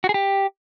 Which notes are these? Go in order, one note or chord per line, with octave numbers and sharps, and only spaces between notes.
F#4
G#4
G4